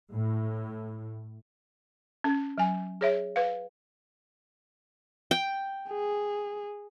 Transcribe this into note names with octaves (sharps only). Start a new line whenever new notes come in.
A2
C#4
F#3 G#5
G#4 C#5 E5
B4 F5
G5
G#4